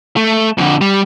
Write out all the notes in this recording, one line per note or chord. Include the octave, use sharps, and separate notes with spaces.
A3
F2 D3
G3